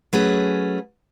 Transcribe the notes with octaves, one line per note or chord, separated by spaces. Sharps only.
F#3 A3 C#4 G#4 B4